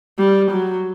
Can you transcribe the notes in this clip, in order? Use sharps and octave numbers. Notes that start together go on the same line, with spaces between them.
G3
F#3